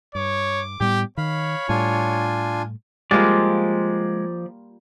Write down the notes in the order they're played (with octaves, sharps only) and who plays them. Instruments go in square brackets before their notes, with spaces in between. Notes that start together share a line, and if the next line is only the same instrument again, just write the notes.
[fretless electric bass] G2 [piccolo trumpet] C#5 [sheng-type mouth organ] D6
[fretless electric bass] A2 G3 B3 [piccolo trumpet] G4
[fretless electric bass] D#3 [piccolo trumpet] C#5 [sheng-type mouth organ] F5 B5
[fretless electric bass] A2 G3 [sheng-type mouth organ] D4 F4 G#5
[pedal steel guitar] F3 D5 [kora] G3 A#3 F4 [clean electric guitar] G#3